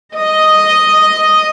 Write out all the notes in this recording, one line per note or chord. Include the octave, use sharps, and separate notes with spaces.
D#5